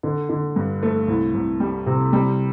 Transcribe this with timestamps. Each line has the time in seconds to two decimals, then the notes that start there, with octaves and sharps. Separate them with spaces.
0.03 D3
0.29 D3
0.56 G2
0.83 A3
1.08 C2
1.34 C2
1.60 G3
1.86 C3
2.13 G3